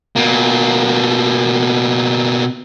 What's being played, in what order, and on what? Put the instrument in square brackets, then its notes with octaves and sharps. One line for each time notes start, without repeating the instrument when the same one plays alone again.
[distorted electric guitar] B2 A#3